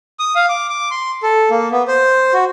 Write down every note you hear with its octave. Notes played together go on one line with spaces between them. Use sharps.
D#6
F5
D6
D6
C6
A4
A#3
B3
C5
F#4